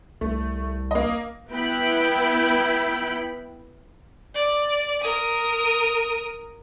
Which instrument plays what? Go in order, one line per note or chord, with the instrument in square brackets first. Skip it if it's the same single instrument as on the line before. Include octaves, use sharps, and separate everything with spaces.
[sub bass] C2 [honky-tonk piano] A3
[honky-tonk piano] A#3 D#5
[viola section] B3 E4 G5 B5
[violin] D5
A#4 D#6